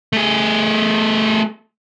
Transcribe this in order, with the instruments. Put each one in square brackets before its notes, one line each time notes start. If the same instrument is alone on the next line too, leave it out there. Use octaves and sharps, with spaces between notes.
[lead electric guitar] A3 G#4